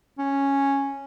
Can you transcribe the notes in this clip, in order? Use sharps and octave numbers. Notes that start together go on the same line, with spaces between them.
C#4